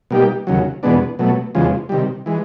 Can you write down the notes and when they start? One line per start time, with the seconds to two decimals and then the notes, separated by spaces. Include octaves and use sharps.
0.11 B2 G3 A#3 D#4 G4
0.47 D#2 C#3 F#3
0.83 E2 B2 G#3 B3 D4
1.19 B2 F#3 A3
1.55 E2 C#3 F3 G#3
1.89 C3 D#3 G3
2.26 E3 G#3